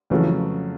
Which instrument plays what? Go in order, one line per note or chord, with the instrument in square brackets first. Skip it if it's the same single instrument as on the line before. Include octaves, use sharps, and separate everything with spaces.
[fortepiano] F2 C#3 F#3 A3 [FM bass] E3